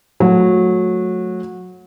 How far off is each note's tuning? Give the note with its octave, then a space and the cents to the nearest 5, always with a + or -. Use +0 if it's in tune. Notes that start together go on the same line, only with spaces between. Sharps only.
F#3 -20 A3 -5